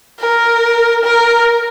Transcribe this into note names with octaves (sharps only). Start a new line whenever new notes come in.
A#4
A#4